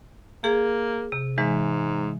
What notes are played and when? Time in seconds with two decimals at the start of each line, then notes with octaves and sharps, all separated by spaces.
0.44 A#3 G#4
1.12 C3
1.38 G#2 E3 G#3